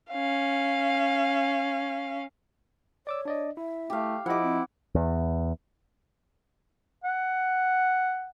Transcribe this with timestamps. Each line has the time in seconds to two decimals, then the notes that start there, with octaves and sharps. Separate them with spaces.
0.11 C#4 F5
3.07 C#5 D5 D6 E6
3.25 D4 D5 D#5
3.57 E4 E5
3.90 A3 G4 F5
4.26 F3 E4 G4 D#5 F#5 D6
4.42 C4
4.95 E2
7.04 F#5